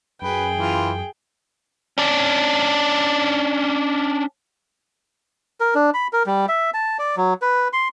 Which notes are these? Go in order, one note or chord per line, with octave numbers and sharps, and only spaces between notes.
F#2 G#4 B4 G5
E3 F4
C#4 D4
A#4
D4
B5
A#4
G3
E5
A5
D5
F#3
B4
C6